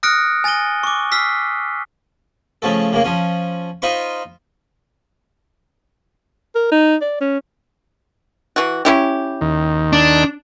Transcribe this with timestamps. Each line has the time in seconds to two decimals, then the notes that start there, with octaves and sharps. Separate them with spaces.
0.03 D#6 F6 F#6 A#6 C#7 D7
0.44 G#5 A6 A#6 D#7 G7
0.83 C#6 D6
1.11 E6 F6 B6 C7
2.62 C#3 F3 A3 A4
2.93 C#3 A#3
3.04 F3 C#4
3.82 D#4 F4 C5 B5 C#6
6.55 A#4
6.72 D#4
7.01 D5
7.20 C#4
8.56 E3 F#4
8.85 C#4 E4 G4
9.41 D#2 D#3
9.93 D4